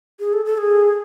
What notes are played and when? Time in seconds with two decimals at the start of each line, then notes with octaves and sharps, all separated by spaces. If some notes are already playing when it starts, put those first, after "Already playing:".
0.19 G#4
0.33 A4
0.45 A4
0.58 G#4